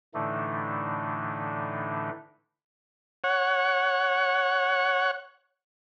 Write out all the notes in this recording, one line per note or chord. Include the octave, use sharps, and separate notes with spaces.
A2 D3 E3 A3 D4 D#4
C#5 F#5